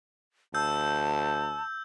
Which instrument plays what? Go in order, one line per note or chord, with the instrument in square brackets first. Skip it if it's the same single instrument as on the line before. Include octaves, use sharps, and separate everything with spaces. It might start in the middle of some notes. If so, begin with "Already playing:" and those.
[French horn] D2 [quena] A5 [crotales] E6 G6